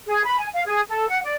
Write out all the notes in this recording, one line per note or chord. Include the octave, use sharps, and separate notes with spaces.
G#4
B5
G#5
F5
G#4
A4
F#5
D5